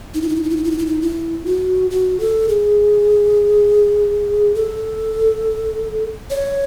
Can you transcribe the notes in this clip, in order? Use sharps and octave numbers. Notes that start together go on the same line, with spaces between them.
D#4
E4
D#4
E4
D#4
E4
D#4
E4
D#4
E4
D#4
E4
F#4
F#4
A4
G#4
A4
C#5